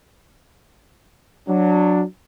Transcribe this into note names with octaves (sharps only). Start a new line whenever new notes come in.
F#3 D4